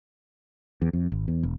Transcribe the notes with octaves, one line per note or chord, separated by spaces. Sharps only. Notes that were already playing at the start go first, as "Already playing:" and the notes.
E2
F2
G#1
E2
E1